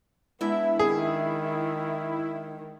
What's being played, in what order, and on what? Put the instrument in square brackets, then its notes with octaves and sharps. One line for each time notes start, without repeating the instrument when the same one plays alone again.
[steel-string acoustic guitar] G#3 D4 E5 [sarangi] B3 [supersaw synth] E4
[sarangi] D#3 [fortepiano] G#4